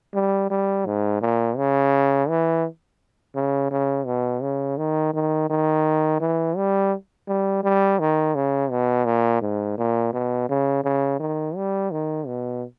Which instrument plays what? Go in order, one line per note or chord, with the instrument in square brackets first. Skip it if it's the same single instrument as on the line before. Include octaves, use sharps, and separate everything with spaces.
[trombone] G3
G3
G#2
A#2
C#3
E3
C#3
C#3
B2
C#3
D#3
D#3
D#3
E3
G3
G3
G3
D#3
C#3
B2
A#2
G#2
A#2
B2
C#3
C#3
D#3
G3
D#3
B2